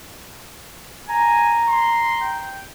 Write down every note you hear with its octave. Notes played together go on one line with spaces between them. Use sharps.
G#5 A#5
C6
G5